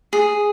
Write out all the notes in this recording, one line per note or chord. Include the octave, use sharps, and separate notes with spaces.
G#4